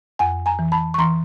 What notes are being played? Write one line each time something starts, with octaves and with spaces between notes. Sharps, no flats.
F2 F#5 G#5
G#5 A#5
E3
A5 B5
C#6
E3 A#5 C6